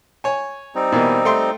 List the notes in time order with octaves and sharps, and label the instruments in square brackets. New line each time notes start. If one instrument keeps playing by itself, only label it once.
[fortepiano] C#5 G#5
[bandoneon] G3 C4 D#4
[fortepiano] B2 E3 A#3
A3 G5 C6